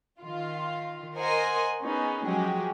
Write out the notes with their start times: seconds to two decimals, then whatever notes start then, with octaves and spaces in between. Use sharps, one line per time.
0.22 D#3 F4
1.18 A#4 C5 D#5 F#5 G#5 C6
1.84 B3 C#4 D#4 G#4
2.25 F3 F#3 G#3 C#4 G4 G#4